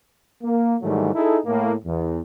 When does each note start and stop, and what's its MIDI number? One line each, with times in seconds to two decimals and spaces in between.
0.43 0.75 58
0.81 1.12 44
0.81 1.12 51
0.81 1.12 52
0.81 1.12 54
0.81 1.12 55
0.81 1.12 57
1.14 1.38 63
1.14 1.38 64
1.14 1.38 68
1.14 1.38 69
1.45 1.72 45
1.45 1.72 58
1.85 2.19 40